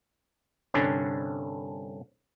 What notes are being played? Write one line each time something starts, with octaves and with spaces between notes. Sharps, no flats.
C2 G2 D3 C#4 D4